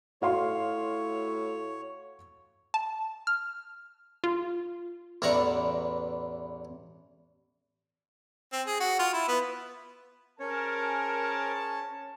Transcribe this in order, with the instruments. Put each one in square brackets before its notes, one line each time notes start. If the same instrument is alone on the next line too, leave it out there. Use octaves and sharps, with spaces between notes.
[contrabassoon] A2 [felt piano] F#4 F5 C6 [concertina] C#5
[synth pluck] A5
F6
F4
[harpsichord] A1 E2 D4 F#5 A#5 C#6
[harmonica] C4
G#4
F#4
F4
E4
B3
[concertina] C#4 C#5 [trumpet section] G#4 C5 G#5 [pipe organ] A#4 [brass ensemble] A5